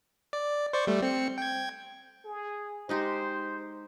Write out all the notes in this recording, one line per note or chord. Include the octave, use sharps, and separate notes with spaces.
D5
C5 D5 C#6
G3 A3
C4 C#7
G5 G#6
G#4
G#3 D#4 G4 C5